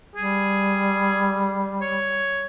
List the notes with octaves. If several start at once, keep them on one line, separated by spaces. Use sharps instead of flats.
G3 G#4
C#5